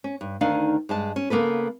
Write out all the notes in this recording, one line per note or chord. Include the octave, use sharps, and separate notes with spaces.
C#4
G2
D2 D#3 D4 D#4 F5
G2 G#3 A5
C#4
C#3 A#3 B3 A4 B4